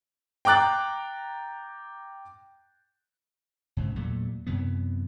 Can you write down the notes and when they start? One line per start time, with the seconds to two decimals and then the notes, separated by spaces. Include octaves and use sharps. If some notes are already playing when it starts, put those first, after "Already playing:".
0.45 G5 A#5 D6 F#6 A6
3.77 G#2 C#3 E3
3.96 E2 A#2 F#3 A3
4.47 F#2 C3 E3 B3